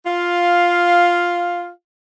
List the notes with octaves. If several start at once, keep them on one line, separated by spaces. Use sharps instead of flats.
F4 F5